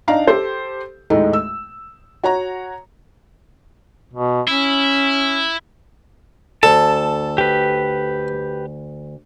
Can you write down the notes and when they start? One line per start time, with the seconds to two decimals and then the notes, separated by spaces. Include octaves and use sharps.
0.08 D4 D#4 D5 F5 A#5
0.27 G4 A4 C5
1.10 D#2 A2 G#3 A3 D#4
1.33 E6
2.24 F#4 C#5 F#5 A#5
4.13 B2
4.48 C#4 E4
6.63 D2 A4 A5
7.38 G4 B4